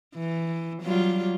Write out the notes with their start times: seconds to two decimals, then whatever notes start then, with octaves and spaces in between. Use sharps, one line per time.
0.14 E3
0.82 F#3 G3 F4